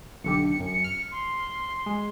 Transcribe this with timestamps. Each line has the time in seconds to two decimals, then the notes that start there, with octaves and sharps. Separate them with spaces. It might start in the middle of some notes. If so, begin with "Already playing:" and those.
0.24 B1 D3 G4 C#7
0.60 F#2
0.84 F6
1.12 C6
1.86 G#3